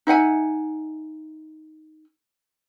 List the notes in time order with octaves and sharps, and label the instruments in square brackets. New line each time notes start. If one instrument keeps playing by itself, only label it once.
[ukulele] D#4 E5 F#5 G#5